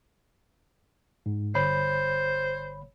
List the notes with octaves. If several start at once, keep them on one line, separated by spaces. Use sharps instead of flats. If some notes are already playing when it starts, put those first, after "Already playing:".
G#2
G1 C5 C#5 B5